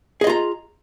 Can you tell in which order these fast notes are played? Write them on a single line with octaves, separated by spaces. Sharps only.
G#4 D#5 F4 A#5